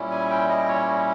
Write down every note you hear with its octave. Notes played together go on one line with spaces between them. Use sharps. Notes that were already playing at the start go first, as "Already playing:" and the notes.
Already playing: A#2 G3 C#4 E4
G#5
G5
D#5
C#5